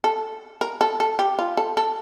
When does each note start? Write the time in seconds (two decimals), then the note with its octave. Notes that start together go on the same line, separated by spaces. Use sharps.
0.04 A4
0.61 A#4
0.81 A4
1.00 A4
1.19 G4
1.39 F4
1.57 A4
1.77 A4